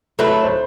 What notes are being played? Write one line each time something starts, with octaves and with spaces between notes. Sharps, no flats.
F#3 A3 E4 B4
C5